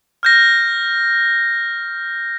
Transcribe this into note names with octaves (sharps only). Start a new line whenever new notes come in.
F6 G6 A#6